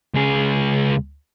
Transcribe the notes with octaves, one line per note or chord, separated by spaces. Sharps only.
C#2 G#4